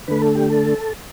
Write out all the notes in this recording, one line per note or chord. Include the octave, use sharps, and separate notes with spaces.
D3 A3 B4
A4
G4
A4